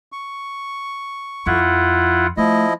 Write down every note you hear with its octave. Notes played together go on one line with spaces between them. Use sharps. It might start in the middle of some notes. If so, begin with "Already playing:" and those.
C#6
F2 E4 F4 F#5
F3 A3 E4 D#5